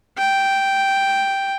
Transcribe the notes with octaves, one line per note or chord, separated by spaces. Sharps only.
G5